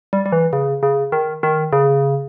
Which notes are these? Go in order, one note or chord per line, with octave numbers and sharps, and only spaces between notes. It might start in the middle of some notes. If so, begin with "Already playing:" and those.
G3
G3
E3
C#3
C#3
D#3
D#3
C#3